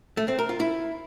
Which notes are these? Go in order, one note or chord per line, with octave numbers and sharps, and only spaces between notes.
A3
C4
A#4
F4
E4